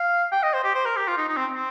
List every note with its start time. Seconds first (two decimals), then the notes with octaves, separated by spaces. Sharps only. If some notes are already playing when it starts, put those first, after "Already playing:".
Already playing: F5
0.32 G5
0.43 D#5
0.53 C5
0.64 G4
0.75 C5
0.86 A#4
0.96 G4
1.07 F4
1.17 D#4
1.28 D#4
1.36 C4
1.54 C4